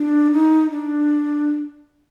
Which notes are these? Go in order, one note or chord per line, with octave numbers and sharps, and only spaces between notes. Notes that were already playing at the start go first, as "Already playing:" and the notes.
Already playing: D4
D#4
D4